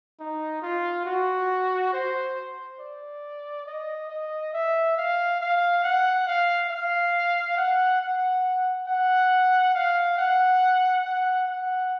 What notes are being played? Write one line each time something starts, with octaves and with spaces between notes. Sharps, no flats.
D#4
F4
F#4
C5
D5
D#5
D#5
E5
F5
F5
F#5
F5
F5
F#5
F#5
F#5
F5
F#5
F#5
F#5